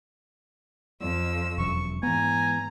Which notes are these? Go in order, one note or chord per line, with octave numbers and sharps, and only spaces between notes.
F2 E6
E1 F#2 C#6
G#2 E3 B3 G#5 A#5